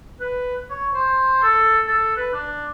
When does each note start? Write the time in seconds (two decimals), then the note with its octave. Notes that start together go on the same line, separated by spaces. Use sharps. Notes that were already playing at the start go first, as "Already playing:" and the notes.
0.20 B4
0.70 C#5
0.94 C5
1.42 A4
1.87 A4
2.16 B4
2.33 D4